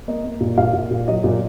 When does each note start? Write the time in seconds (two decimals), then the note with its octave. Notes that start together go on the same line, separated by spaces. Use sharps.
0.08 A#3 D#5
0.25 A#3
0.41 A#2
0.58 A#2 F5
0.74 A#2
0.91 A#2
1.08 F#3 D#5
1.24 A#2